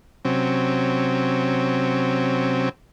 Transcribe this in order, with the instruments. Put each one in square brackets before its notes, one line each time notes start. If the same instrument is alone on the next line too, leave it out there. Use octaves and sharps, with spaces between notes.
[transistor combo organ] C3 F#3 C4 C#4